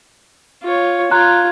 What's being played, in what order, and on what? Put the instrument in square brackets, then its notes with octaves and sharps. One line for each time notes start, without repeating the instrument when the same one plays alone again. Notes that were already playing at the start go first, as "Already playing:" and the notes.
[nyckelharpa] F4 C#5
[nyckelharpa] F4 [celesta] A#5 F#6 [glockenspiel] C6 G#6